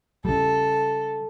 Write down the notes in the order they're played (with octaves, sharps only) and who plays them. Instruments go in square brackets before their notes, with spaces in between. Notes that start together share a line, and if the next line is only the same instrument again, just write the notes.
[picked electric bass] C#3 G3 [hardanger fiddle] A4